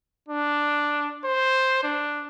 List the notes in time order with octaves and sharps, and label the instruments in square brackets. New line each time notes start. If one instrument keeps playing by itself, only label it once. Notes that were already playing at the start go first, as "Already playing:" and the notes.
[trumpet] D4
C5
D4